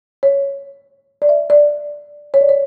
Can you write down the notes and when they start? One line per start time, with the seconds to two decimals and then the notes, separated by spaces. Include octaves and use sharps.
0.23 C#5
1.22 D5
1.29 E5
1.50 D5
2.34 C#5
2.41 D5
2.49 C#5